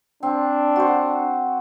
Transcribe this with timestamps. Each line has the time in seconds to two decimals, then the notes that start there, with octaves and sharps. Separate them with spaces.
0.23 C4 D4
0.76 F#4 C5